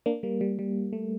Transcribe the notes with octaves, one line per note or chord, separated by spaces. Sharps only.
A#3 D4
G3 A#3
G3
G3
A3